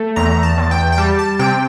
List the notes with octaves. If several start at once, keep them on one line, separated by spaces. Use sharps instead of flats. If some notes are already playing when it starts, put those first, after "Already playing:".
Already playing: A3
E2 A#5
A5
E2
G5
G5
G3 A5
A5
C3 G5